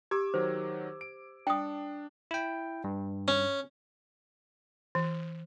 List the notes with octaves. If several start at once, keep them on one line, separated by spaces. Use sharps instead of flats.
G4 D6 E6 G#6
D#3 F#3 C5
D7
D4 G5 D#6
E4 G5
G2
C#4
E3